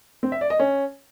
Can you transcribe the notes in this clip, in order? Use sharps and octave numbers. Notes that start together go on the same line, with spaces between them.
C4
E5
D5
D#5
C#4